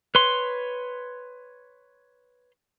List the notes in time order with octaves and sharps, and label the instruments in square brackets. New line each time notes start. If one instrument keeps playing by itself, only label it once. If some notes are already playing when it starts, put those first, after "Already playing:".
[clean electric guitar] B4 C#5 C6